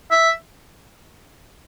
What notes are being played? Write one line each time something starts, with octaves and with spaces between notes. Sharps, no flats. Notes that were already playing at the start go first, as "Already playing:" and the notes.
E5